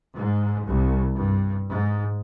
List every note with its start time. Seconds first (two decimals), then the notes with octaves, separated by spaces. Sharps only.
0.13 G#2
0.63 C2
1.15 G2
1.70 G#2